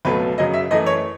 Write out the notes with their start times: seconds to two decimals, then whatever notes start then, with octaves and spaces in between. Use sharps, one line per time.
0.05 C#2 B2 F#3 A3 B4
0.38 F#2 C#3 F#3 D#5
0.54 E5
0.70 F#2 E3 A3 D#5
0.86 C#5